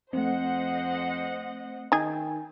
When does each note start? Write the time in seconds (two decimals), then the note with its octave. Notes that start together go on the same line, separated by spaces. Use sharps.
0.13 F2 A3 C4 C5 D#5 F#5
1.92 D#3 D#4 G#4 G5 G#5